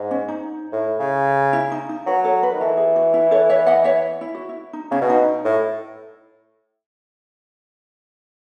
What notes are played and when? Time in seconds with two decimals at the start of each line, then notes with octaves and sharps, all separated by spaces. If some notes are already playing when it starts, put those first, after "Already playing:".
Already playing: G#2
0.11 C#4
0.28 D#4
0.73 A2
0.99 C#3
1.53 E4
1.72 D#4
1.89 D#4
2.07 F#3 B4
2.24 A4 C#5
2.43 B4
2.53 D#3
2.60 E3 A4
2.77 G#4
2.96 F#4
3.14 E4
3.31 A4 C#5
3.49 C#5 E5
3.67 D#5 F#5
3.84 C#5 E5
4.21 E4
4.35 F#4
4.49 E4
4.73 D#4
4.91 C#3 C#4
5.01 B2
5.10 D#4
5.45 A2